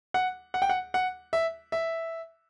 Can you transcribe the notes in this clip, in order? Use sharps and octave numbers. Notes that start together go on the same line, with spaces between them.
F#5
F#5
G5
F#5
F#5
E5
E5